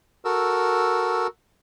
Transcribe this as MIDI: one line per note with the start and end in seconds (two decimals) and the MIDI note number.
0.25 1.27 66
0.25 1.27 69
0.25 1.27 70
0.25 1.27 88